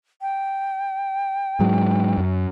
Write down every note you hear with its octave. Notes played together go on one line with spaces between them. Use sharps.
G5
G#2 F#3 G#3
F#2